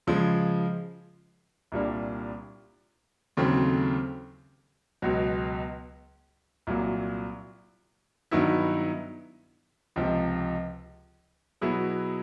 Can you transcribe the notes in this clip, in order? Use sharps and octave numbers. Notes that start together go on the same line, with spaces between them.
C#3 F3 G#3
C2 A#2 G3 A#3 D4
D#2 C#3 F#3 A3 C4
C#2 B2 F#3
C2 A#2 F#3 A#3
G2 D#3 F#3 B3 E4
C#2 C3 F3
B2 F#3 B3 E4 G#4